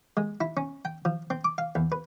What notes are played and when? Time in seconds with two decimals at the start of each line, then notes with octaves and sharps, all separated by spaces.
0.17 G#3
0.41 E4
0.57 C#4
0.85 G5
1.05 F3
1.30 C4
1.45 D6
1.58 F5
1.75 E2
1.92 B4